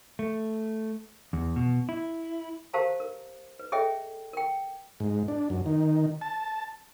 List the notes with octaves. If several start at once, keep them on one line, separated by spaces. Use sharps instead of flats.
A3
E2
B2
E4
G4 A#4 C5 F5 A5 A#5
A#4
B4
G#4 A4 C#5 D#5 E5 G5
A#4 G5
G#2
D4
F#2
D#3
A5